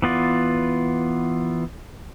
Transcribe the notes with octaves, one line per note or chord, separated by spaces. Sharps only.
E3 B3 F4 D5